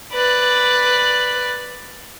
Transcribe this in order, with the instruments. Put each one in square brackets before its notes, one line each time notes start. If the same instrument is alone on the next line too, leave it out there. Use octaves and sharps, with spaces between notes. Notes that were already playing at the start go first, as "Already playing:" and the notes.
[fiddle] B4 D5